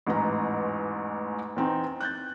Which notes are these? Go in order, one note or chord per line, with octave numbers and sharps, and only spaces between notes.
A1 E2 G#2 B4 A#5
E2 C4 D#4
F#6 G6 A6